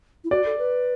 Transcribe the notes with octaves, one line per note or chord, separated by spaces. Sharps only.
E4
F#4 D5
A4
B4